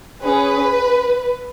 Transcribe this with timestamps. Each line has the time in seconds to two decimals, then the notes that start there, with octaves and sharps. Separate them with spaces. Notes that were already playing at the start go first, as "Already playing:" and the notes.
0.22 C#4 G#4 B4